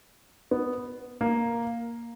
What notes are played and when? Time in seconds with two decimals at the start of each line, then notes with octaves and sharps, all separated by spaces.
0.51 B3
1.21 A#3